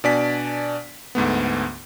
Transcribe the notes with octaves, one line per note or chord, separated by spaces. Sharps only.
B2 D4 D5 G#5 B6
D2 G#2 A3 B3